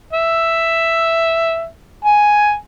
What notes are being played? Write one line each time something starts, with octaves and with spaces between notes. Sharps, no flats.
E5
G#5